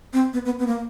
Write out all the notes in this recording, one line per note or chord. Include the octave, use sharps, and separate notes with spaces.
C4
B3
B3
B3
A#3